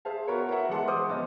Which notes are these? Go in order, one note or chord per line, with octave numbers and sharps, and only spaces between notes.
G#4 C5 E5 F5 A5
B3 F#4 A#4 B4 C#5
E4 A#4 B4 C#5 E5 F#5
E2 G#3 F#5 A5 C6
C5 D6 D#6
F1 B3 D#5